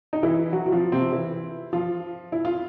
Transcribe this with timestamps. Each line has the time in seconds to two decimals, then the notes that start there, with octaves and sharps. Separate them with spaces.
0.13 D#4
0.23 E3 E4
0.52 F#3 F#4
0.66 F#4
0.72 F3 F4
0.92 C3 C4
1.12 E3 E4
1.73 F3 F4
2.32 E4
2.45 F4